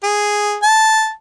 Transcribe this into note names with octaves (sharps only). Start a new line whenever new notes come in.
G#4
A5